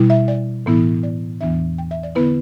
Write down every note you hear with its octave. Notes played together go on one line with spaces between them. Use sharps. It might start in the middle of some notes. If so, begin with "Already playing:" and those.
Already playing: B2 G3 E4
E5
D5
A2 E3 B3 E4
D5
E2 E3 B3 D4 E5
G5
E5
D5
D3 B3 E4 B4